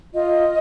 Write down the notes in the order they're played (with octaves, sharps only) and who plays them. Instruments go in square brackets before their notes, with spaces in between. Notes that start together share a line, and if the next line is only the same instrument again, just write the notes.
[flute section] F4 D#5